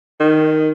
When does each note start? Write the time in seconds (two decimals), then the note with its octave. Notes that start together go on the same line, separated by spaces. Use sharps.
0.20 D#3